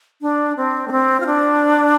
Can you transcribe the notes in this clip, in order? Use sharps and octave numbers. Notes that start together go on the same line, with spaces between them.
D4
C4
A3
C4
F4
D4